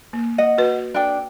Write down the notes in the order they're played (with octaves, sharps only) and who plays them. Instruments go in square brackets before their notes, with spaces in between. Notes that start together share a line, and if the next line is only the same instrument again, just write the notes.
[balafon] A#3
[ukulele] D#5 F#5
[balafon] F#4 B4
[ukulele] D4 A4 G5